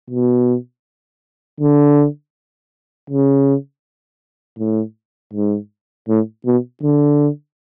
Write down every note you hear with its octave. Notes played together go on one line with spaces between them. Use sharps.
B2
D3
C#3
A2
G#2
A2
B2
D3